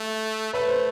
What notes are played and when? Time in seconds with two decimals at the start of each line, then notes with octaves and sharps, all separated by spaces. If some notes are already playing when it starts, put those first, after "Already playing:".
Already playing: A3
0.53 A3 B4
0.68 C5